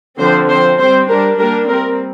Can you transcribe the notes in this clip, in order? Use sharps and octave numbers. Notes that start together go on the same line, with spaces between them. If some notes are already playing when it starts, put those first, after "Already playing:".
D3 F3 C4 C5
F3 C4 C5
G3 C4 C5
G3 D4 A#4
G3 A#3 D4 A#4
G3 C4 A#4